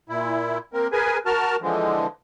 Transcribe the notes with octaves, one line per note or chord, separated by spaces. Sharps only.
A#2 E4
A#3 C4 A#4
G#4 A#4 B4 G#5
F#4 A#4 A5 F6
D3 E3 F3 G#3